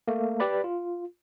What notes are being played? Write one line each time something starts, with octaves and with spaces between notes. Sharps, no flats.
A3 A#3
G4 B4 D5 B5
F4